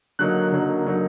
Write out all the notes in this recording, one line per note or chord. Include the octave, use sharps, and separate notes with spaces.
D3 F#3 A#3 D#4 F#6
D3 F#3 A#3 D#4
D3 F#3 A#3 D#4